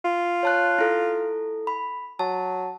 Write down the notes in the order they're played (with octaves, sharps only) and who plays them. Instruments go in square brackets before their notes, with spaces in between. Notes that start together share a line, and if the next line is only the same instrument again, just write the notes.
[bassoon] F4
[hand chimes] C#5 A5 F#6
E4 A4
B5
[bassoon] F#3 [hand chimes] A5